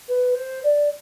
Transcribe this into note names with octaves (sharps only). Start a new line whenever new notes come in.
B4
C5
D5